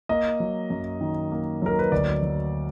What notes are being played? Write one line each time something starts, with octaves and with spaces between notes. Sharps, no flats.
A#3 D#5
F#3
F#2
D#3
A#3
F#3 A#4
B4
D2 D5
F#3